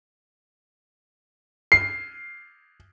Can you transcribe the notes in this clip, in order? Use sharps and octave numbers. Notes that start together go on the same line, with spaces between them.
C7